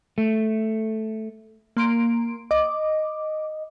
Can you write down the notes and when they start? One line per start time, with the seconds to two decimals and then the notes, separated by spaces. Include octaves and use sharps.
0.18 A3
1.77 A#3 C6 D7
2.51 D#5 D6